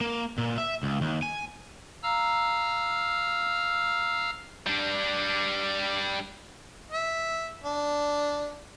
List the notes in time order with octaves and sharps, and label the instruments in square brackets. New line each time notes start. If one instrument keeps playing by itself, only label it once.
[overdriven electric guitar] A#3
A#2
E5
C#2
D#2
G#5
[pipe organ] F5 A#5 E6 F6
[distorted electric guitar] G3 D4
[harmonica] E5
D4